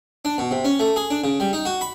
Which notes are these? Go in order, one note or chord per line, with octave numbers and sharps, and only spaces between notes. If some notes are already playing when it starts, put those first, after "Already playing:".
D4
B2
C3
C#4
A3
G#4
D4
C#3
G3
D#4
F#4
B5